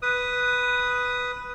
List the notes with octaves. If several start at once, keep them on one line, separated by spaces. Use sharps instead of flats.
B4 D#6